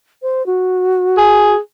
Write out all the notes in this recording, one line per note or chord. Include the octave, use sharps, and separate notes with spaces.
C5
F#4
G#4